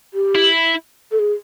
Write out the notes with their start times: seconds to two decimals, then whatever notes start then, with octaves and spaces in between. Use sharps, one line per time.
0.14 G4
0.35 E4
1.12 A4
1.19 G#4